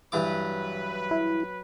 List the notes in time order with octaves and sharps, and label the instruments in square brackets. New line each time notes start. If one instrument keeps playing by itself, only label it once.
[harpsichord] G2 E3 D6 [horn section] F#3 B4
[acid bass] E4